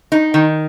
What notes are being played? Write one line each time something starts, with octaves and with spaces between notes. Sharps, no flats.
D#4
D#3